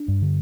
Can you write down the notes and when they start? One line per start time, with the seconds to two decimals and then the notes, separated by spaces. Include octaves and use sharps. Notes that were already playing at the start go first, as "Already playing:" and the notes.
Already playing: D4
0.08 G2
0.22 D3